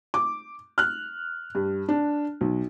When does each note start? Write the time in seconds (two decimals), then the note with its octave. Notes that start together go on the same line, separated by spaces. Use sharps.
0.14 D6
0.78 F6 F#6
1.55 G2
1.89 D4
2.41 B1